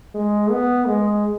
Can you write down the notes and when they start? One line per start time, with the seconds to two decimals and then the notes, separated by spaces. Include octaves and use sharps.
0.15 G#3
0.51 B3
0.87 G#3